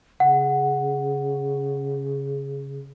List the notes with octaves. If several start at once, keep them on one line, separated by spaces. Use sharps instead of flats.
C#3 F#5